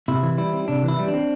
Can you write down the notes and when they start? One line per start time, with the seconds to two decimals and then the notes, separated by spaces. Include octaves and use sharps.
0.08 C3 E4
0.23 E3
0.37 G3 E4
0.53 C4
0.68 C3 D4
0.83 E3 E4
0.99 G3
1.08 D4
1.14 C4